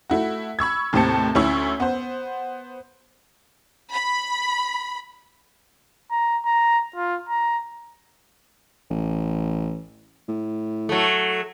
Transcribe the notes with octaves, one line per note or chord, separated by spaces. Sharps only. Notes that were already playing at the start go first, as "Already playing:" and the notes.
A3 E4 F#4
B5 C#6 E6 G#6
D#2 A2 C3 C4 A5 C#7
D2 C#4 E4 C#6 E6
B3 C5
B5
A#5
A#5
F4
A#5
A1
A2
F#3 A3